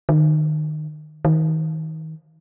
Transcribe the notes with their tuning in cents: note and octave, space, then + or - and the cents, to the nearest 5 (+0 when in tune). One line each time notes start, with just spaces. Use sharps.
D#3 -25
D#3 +30